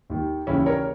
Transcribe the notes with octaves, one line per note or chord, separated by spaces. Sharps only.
D#2 D#3
D#2 C#3 E3 C#4 E4
A#4 C#5